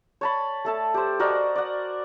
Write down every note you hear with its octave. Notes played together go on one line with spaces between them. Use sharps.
C#5 A5 B5
A3 A4 A5
G4 C5
F#4 A#4 D5 D#5
D5 F#5